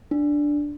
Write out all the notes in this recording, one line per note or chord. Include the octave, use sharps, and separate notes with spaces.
D4